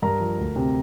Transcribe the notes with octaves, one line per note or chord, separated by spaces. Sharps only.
G2 A#4 A#5
F3
D2
C3